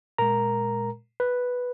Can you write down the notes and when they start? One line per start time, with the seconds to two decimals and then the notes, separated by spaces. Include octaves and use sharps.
0.18 A#2 G#3 A#4 A#5
1.20 B4